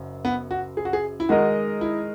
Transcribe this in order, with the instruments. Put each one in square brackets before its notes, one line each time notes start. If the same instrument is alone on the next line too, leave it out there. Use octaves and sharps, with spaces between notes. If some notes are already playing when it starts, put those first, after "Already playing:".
Already playing: [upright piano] F#1 F#2
[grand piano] B3
F#4
G#4
F#4
G#4
E4
[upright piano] D#3 G#3 D#4 A#4 D#5 [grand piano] F#4
[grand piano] E4